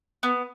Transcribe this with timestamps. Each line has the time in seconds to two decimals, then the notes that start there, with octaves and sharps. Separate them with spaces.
0.23 B3